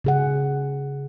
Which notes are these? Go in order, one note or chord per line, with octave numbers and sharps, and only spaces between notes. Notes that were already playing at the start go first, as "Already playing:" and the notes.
C#3 G#4 F#5